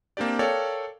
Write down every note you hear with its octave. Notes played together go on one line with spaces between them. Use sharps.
A#3 C4 D4 G4 D5
A4 A#4 C#5 D5 F5 G5